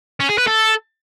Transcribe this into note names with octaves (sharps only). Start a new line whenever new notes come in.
C#4
G#4
B4
A4